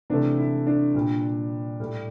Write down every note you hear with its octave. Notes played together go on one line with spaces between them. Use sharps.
C3 E3 A3 D4
E4
D4
A#2 G3
A2 G3